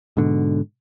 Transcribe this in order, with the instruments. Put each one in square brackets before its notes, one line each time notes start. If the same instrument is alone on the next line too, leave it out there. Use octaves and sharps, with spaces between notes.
[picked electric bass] G#2 B2 D3